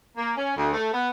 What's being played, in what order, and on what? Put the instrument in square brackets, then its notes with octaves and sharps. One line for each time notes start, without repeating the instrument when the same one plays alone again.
[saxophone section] A#3
C#4
D2
A3
B3